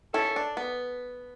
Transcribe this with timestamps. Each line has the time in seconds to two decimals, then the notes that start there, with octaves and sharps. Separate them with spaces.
0.14 C#4 E4 A4
0.36 D4
0.57 B3